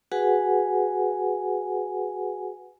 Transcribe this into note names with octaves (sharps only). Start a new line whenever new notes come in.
F#4 G#4 B4 F#5 G#5